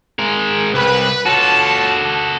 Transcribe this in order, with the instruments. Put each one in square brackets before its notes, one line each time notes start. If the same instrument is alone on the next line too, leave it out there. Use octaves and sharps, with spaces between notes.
[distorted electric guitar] G#3 A#4
[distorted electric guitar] C2 [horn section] B4
[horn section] F4 C#5 A5 [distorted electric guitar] F#4 A4